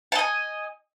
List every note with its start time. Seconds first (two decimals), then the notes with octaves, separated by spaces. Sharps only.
0.12 A5
0.15 D#5
0.19 G#5